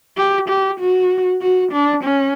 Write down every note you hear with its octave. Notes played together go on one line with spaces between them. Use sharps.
G4
G4
F#4
F#4
D4
C#4